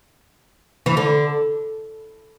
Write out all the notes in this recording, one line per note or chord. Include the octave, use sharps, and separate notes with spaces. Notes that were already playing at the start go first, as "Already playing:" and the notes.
E3
D3